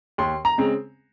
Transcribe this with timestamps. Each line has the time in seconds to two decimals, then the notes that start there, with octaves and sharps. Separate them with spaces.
0.18 D#2 C6
0.45 A#5
0.58 C#3 G#3 C4